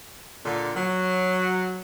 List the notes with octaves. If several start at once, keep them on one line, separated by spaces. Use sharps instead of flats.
A#2 D3
F#3